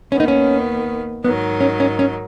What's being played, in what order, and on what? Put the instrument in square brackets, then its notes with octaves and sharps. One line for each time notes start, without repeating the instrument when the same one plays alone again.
[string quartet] D#2 D#3 B3 [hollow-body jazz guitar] C#4
[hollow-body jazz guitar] D#4
C#4
[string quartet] G#2 D#3 F#3 D#4 [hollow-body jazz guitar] B3
[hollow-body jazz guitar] C#4
C#4
C#4